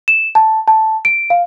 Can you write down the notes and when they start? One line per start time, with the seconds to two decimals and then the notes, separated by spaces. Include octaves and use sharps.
0.08 E7
0.35 A5
0.68 A5
1.05 D7
1.30 F5